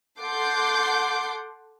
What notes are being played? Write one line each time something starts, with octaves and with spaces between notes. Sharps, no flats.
A4 F#5 C6 D6 G6